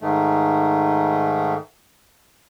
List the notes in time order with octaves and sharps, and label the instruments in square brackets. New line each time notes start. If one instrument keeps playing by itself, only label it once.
[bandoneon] G#2 D#3 A3